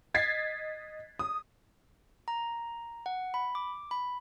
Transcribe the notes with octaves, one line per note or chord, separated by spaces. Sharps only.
D#5 G#6 A6 B6 C7
D#6
A#5
F#5
B5
D6
B5